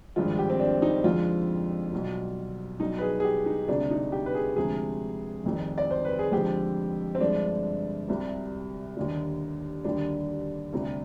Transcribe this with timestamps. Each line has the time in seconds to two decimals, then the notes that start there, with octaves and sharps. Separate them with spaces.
0.16 G#1 G2 F3 G#3 F4
0.39 G4
0.49 C4
0.60 D4
0.82 D#4
1.04 F2 D3 F3 G#3 F4
1.93 B1 B2 G3
2.80 B1 B2 G3 D#4
2.98 B4
3.02 G#4
3.20 G#4
3.24 G4
3.46 D#4
3.68 D2 C3 G3 D4
3.91 D#4
4.12 G4
4.26 B4
4.35 G#4
4.56 D2 C3 F3 G#3 G#4
5.44 F1 F2 D#3 G3
5.78 D5
5.91 C5
6.05 B4
6.19 G#4
6.32 F2 D3 F3 G#3 G4
7.15 C4
7.21 G1 G2 D3 F3 G#3 D4
8.08 C2 C3 G3
8.97 D#2 D3 G3
9.84 D#2 D3 G3 D4
10.73 D2 C3 G3